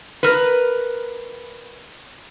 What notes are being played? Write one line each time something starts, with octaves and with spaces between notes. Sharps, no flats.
A#4 B4